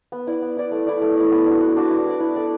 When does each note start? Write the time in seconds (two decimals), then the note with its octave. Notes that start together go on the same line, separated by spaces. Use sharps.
0.12 B3
0.27 E4 D5
0.42 B3
0.57 E4 D5
0.71 A3
0.87 E4 D5
1.02 A3
1.16 E4 D5
1.32 B3
1.46 D4 F#4
1.61 B3
1.77 D4 F#4
1.90 E4
2.06 A4 D5
2.20 E4
2.36 A4 D5